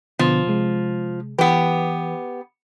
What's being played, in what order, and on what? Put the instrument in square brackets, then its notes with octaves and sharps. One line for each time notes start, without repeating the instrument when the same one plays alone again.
[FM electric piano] B2 D3 B3 [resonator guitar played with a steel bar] F3
[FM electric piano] C3 G#3
[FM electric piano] E3 B4 [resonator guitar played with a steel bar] B3 G4